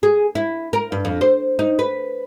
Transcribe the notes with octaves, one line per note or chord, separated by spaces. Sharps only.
G#4
E4
A#4
G2
F2
C5
D#4
B4